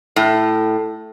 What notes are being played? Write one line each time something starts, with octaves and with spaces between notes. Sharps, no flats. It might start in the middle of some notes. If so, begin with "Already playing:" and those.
A2